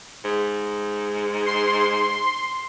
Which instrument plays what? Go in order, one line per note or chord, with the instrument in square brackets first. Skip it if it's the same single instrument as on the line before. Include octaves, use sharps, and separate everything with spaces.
[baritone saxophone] G#2
[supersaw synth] C6